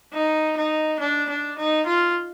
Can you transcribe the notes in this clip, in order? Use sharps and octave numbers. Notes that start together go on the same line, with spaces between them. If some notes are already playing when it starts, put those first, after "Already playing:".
D#4
D#4
D4
D4
D#4
F4